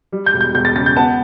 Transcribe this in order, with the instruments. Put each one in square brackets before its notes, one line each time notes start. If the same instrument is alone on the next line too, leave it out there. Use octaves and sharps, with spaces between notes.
[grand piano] G3
G6
E1
G6
E1 G6
A6
C#3 A6
G6
B3 A5